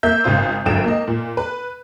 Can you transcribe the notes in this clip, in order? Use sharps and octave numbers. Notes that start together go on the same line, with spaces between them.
A#3 E5 G6
G#1 C#3 F4 C5
G#1 F#2 D3 G5 E7
A#3 D#5
A#2
B4